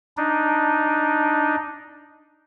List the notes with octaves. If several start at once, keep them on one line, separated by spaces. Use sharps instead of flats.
D4 D#4